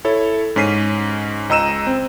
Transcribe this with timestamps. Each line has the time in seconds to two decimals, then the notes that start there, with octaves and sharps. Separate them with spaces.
0.05 E4 A4 C#5
0.56 G#2 C#4 B6 C7 D#7
1.49 C#2 D#5 A#5 E6 D#7 E7
1.87 C4